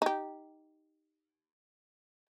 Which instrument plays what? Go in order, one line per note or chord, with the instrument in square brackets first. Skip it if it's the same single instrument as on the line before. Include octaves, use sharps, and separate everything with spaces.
[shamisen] D#4 G4